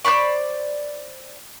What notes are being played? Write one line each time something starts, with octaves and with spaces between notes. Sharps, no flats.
C5 D5 B5 C#6